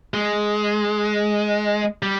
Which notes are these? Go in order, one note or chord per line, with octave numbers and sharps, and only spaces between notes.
G#3
G3